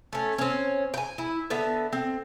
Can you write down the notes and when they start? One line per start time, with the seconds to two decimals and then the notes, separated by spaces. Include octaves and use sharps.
0.13 A3 C#4
0.38 C4 C#4
0.94 G5 G#5
1.18 E4
1.50 D3 B3 E5
1.93 C4